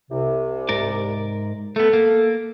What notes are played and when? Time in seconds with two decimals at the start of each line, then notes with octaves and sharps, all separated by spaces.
0.11 C2 C3
0.69 G#2 A#4 D5
1.76 A3 B3 A4
1.93 A#3